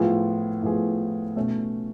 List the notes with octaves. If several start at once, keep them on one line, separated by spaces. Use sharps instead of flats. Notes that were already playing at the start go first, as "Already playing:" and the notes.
Already playing: A2 F3 B3 F4 G#4
A2 F3 B3 F4 G#4
B2 A3 C#4